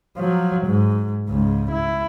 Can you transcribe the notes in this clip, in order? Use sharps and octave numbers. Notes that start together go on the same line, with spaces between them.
F3 F#3
G#2
C#2 G#2
E4